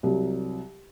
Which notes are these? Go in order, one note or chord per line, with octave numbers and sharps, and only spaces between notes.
C2 F#3